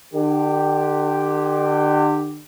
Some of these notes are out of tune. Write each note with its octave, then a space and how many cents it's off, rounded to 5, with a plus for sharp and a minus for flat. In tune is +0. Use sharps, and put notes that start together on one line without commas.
D3 +40 G4 +0